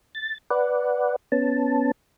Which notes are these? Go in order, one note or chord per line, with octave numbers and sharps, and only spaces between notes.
A6
B4 D5 F#5
B3 C#4 A5